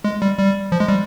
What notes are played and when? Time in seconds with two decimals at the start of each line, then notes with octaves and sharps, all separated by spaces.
0.04 G#3
0.22 G3
0.39 G3
0.72 F3
0.80 G#3
0.89 G3